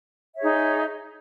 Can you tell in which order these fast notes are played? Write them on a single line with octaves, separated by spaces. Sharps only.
E5 C#5 G#4 D#4